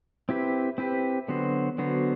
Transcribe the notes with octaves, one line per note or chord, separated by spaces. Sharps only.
C4 E4 G4 B4
C4 E4 G4 B4
D3 F#3 B3 F#4 C5
D3 F#3 B3 F#4 C5